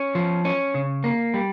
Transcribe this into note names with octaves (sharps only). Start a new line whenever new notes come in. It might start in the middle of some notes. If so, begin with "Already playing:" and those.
Already playing: C#4
F3
C#4
C#3
A#3
G3